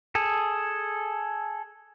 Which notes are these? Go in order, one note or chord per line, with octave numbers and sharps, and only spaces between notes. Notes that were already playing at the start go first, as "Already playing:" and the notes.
G#4 A4